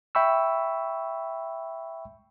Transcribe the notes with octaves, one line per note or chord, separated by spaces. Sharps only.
E5 G5 B5 C#6 E6